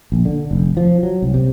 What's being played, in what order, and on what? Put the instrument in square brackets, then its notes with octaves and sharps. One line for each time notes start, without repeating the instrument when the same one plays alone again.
[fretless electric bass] A#1
D3
F1
F3
F#3
C2
C3